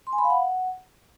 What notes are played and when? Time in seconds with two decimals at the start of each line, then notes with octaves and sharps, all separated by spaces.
0.07 C6
0.13 G#5
0.18 B5
0.24 F5
0.30 F#5